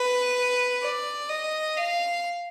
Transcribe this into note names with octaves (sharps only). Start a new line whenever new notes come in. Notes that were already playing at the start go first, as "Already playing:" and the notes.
Already playing: B4
D5
D#5
F5